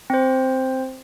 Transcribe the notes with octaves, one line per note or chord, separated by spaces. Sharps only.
C4 C5